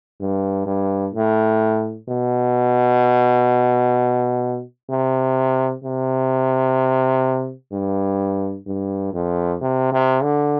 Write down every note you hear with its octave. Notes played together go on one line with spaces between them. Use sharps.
G2
G2
A2
B2
C3
C3
G2
G2
F2
C3
C3
D3